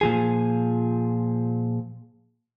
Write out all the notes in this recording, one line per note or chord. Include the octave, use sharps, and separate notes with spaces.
A#2 F3 G#4